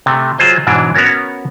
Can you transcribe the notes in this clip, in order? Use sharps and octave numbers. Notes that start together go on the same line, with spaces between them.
C3 A3
F#3 F4 G#4 C5 D#5
G#2 B2 E3 F#3 D4
B3 C#4 F#4 A#4 C#5